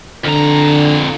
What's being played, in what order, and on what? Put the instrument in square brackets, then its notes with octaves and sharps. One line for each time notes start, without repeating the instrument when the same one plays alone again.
[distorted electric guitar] F2 A#5 [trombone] D3